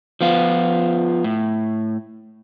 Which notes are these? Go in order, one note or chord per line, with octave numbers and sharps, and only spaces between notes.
F3 B3 F4
A2